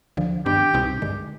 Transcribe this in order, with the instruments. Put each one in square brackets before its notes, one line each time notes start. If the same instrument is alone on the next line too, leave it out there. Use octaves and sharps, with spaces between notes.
[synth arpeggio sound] D2 D3 F3
[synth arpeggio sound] G2 D#3 B3 D4 [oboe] G4
[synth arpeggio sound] C2 B2 G3 C4 D#4
G2 D3 G#3